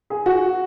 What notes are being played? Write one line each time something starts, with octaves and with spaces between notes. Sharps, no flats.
G#4
F#4